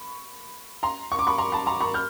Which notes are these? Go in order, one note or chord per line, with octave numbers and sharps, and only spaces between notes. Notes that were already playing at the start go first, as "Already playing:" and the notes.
Already playing: B5 C#6
A#5 C6
C#6
D6
B5 C#6
A#5 C6
A5 B5
A#5 C6
B5 C#6
F6 G6